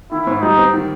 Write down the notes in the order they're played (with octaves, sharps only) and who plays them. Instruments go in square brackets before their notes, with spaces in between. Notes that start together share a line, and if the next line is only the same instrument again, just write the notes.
[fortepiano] D#3 [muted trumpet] E4
[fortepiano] G#2
[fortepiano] G3 [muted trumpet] D#4
[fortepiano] C4
D#3